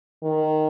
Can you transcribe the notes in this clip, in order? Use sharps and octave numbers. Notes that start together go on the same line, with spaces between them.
D#3